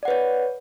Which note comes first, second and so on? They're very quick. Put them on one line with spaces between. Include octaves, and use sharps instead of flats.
D5 F#5 B4 C#5